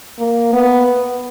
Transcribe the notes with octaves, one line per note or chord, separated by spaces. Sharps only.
A#3
B3